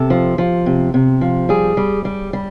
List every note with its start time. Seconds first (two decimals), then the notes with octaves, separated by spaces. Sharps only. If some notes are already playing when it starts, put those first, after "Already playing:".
Already playing: C3 A4
0.10 F3
0.38 F3
0.66 C3
0.94 C3
1.21 F3
1.49 G3 G#4
1.77 G3
2.05 G3
2.33 G3